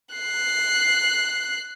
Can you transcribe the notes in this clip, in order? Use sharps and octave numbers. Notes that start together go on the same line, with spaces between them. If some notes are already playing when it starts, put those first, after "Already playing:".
F#6 C7